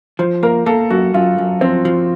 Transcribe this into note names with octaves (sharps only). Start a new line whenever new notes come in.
F3 C5
A#3 A#4
A#3 A4
F#2 F#4
F#2 F4
F#2
F3 C4
F3